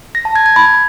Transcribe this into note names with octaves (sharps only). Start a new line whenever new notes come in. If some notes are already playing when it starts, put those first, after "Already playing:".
A#6
A5
G#6
G#6
B5